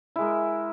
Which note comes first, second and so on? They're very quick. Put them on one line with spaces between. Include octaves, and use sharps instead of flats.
E4 G#3 A#4